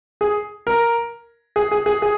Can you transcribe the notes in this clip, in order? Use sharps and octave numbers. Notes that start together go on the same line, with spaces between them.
G#4
A#4
G#4
G#4
G#4
G#4